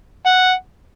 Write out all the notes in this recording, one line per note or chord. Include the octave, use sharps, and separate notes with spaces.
F#5